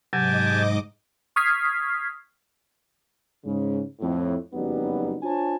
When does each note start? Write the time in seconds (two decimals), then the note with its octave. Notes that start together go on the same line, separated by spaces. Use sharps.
0.13 G#2 C3 F#3 G4 D#5 G#5 A5 D6
1.36 C#6 D#6 F6 G#6 B6 C7
3.45 G#2 C#3
4.00 F2 A2
4.53 F#1 F2 F#3 G3 B3 D#4
5.23 D4 F4 C5 C#5 G#5 A5